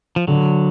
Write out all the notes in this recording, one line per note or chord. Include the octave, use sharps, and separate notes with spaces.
F3
D3 F#3